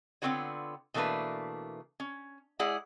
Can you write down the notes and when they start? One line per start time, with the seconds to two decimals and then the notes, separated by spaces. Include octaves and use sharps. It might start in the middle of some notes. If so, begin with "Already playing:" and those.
0.22 D3 B3 C4 F4 F#4 C#5
0.94 B2 E3 A3 A#3 D4 B4
2.00 C#4
2.59 G#3 E4 G#4 D5 F#5